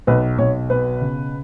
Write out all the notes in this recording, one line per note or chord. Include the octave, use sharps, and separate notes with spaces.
B1 B4
B1 C#5
B2 B4
C#3